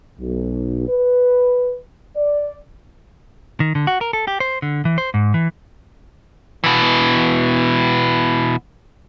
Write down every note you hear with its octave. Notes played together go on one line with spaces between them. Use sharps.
B1
B4
D5
D#3
D3
F#4
A#4
A4
G4
C5
D3
E3
C5
G#2
E3
B2 E3